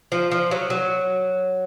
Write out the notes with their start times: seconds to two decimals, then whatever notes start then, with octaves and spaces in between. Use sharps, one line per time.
0.12 F3
0.31 F3
0.51 F#3
0.70 F#3